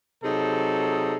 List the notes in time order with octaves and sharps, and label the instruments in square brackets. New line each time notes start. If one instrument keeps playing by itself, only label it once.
[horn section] C3 F#3 D#4 G#4 A4